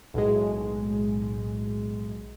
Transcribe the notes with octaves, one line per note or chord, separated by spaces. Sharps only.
B1 A2 G#3